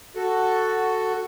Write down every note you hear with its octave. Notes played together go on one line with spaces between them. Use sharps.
F#4 A4